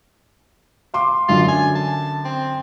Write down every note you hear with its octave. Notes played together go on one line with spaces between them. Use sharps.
F5 C6 D6
F#2 D3 F#3 F4
G#5
A5
C4